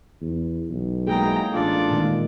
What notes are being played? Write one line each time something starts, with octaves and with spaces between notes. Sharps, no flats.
E2
B1
F#3 G#3 A#3 E4 G#4 G5 A#5
A1 D4 F4 A4 D5
A#2 D#3 G#3